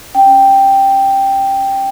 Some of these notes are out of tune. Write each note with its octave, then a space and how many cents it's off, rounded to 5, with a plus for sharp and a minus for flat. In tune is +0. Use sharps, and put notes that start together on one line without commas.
C#4 +0 G5 +0